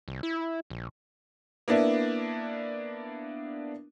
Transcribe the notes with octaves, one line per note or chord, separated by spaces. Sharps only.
C2
E4
A#1
A#3 B3 D4 E4